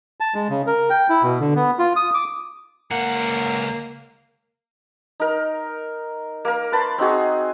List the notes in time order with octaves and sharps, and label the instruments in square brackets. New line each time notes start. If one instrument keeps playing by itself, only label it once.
[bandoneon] A5
G#3
C#3
A#4
G5
E4
B2
D3
B3
F4
D#6
D6
[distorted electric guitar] C#2 F#5 [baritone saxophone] A#3
[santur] D#4 A#4
A#3 A#4
B4 A5 B5 C6
C4 D#4 F#4 G#4